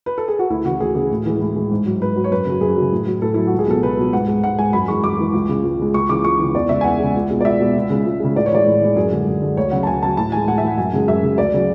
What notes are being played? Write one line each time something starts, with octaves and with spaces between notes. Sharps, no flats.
B4
A4
G#4
F#4
D2 E4
C#3 E3 F#4
D2 G#4
C#3 E3 G#4
A2
E3 G#3
A2
E3 G#3
G#2
F#3
G#2 B4
F#3
C#5
F#2 B4
C#3 F#3
F#2 G#4
C#3 F#3
A2
F#3
A2 A4
F#3 E4
F#4
C#2
G#4
B2 F#3 A4
C#2 B4
B2 F#3
G#2 F#5
G#3
G#2 F#5
G#3 G#5
F#2 B5
E3 G#3 C#6
F#2 D6
E3 G#3
C#2
C#3 G#3
C#2
C#3 G#3
C#2 C#6
C#3 E3 D6
C#2 C#6
C#3 E3
E2 D5
C#3 G#3 E5
G#5
E2 F#5
C#3 G#3
C#2
B2 G#3
D5
C#2 E5
B2 G#3
C#2
C#3 G#3
C#2
C#3 G#3
A2 D5
C#5
E3 G#3 D5
A2
E3 G#3
F#2 G#4
D3 G#3
F#2
D3 G#3
D2 C#5
C#3 F#3 F#5
A5
D2 G#5
C#3 F#3 A5
A2 A5
E3 G#3 G#5
A2 F#5
E5
E3 G#3 F#5
F#2 G#5
C#3 G#3
F#2 E5
C#3 G#3
D2 D5
C#3 F#3